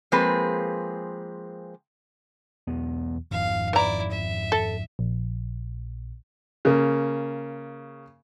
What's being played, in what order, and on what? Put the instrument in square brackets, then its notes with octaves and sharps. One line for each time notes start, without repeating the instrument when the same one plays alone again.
[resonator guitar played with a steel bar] F3 G#3 A#3 C4 G#4 B4
[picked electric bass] B1 E2 B3
[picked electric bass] G#1 F2 D#3 [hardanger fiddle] F5
[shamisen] E3 A#5 [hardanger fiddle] E4 D5
[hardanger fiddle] E5
[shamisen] A4
[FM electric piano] A#1
[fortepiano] C#3 A#3